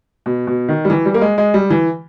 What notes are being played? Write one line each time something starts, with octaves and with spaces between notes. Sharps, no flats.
B2
B2
D#3
G3
E3
G3
A#3
G#3
G#3
G3
E3